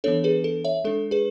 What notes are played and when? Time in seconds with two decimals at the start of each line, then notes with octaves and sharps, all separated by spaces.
0.04 E3 B3 D4 A4 C#5
0.24 G#4 B4
0.44 A4
0.64 C#5 E5
0.84 G#3 D4 A4
1.11 G#4 B4